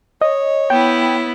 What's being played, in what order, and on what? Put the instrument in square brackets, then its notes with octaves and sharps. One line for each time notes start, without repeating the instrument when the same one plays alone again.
[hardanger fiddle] C#5 [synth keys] D#5
[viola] B3 E4 [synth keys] G5